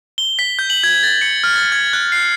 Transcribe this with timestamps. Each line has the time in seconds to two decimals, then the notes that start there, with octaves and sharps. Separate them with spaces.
0.18 G7
0.39 B6
0.59 G6
0.70 F#7
0.84 G#6
1.03 A6
1.21 C#7
1.44 F6
1.56 A6
1.72 G#6
1.93 F#6
2.12 C7